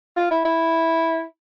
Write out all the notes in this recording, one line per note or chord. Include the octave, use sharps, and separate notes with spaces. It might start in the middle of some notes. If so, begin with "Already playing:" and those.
F4
E4
E4